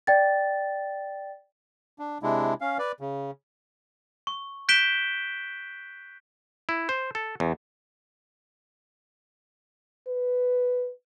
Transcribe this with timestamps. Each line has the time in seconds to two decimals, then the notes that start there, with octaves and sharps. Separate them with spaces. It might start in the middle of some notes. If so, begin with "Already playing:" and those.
0.07 D5 G5 A6
1.99 D4
2.23 C3 G#3 D4 E4
2.61 C#4 F5
2.78 B4 D5
3.00 C#3
4.27 C#6
4.69 F#6 G6 B6 D7 E7 G7
6.69 E4
6.89 C5
7.15 A4
7.40 E2
10.07 B4